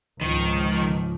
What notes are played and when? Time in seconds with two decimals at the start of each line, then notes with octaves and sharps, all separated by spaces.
0.21 C#2 G#2 D#3 F3